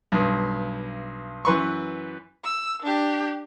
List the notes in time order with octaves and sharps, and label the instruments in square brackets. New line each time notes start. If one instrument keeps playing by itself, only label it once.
[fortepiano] B1 G2
F#2 E3 B4 C6 C#6
[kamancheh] E6
D4 G4